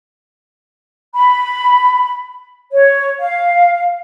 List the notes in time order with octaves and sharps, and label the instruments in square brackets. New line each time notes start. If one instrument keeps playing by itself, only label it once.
[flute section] B5
C#5
F5